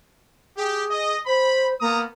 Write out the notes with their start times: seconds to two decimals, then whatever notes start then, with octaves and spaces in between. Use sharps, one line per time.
0.57 G4 G#4
0.91 D#5
1.26 C5 B5
1.81 A#3 B3 A#5 D#6